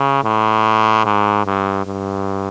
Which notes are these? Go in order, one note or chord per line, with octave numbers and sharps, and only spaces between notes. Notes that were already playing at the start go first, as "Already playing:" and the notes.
Already playing: C#3
A2
G#2
G2
G2